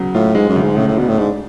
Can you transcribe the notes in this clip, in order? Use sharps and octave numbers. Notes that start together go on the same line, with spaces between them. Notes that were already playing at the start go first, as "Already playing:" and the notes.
Already playing: C#3 F#3 B3
A2 F4
G#2 G#3
F#2
D2
G#2
A2 C#3
A2
B2 D4
A2
G#2 D4